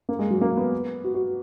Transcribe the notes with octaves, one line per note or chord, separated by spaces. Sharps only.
A#3
G#3
F#3
A#3
B3
F#4
F#4